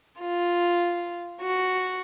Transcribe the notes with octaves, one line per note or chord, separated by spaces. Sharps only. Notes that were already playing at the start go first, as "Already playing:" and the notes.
F4
F#4